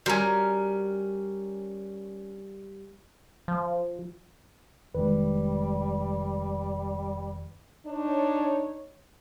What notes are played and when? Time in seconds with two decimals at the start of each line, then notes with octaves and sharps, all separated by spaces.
0.06 G3 C4 C#4 F#4 A#4
3.48 F3
4.95 F1 D#3 G3 G#3 B4
7.87 D4 D#4 C#5